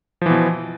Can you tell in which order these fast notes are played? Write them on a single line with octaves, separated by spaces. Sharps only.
F3 E3 B2